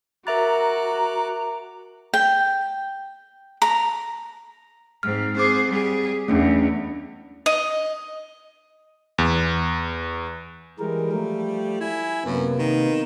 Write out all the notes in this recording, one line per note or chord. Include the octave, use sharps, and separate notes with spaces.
F#4 A#4 E5 A#5 D6 F#6 A6
G5
A#5
G#2 C4 F6
C4 G#4 C5 D6
G3 G#4
E2 A3 C#4 D4
D#5
E2
E3 G3 G#3 A#4
F3 A3
E4 G#5
F#2 C3 A#3 B3
D#3